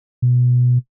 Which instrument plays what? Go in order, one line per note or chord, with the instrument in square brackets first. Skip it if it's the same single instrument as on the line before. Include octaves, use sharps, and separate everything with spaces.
[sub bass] B2